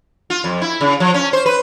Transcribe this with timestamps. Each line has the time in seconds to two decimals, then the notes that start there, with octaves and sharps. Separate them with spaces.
0.30 F4
0.44 F2
0.61 E4
0.81 C#3
1.00 F3
1.14 C#4
1.33 C5
1.46 B4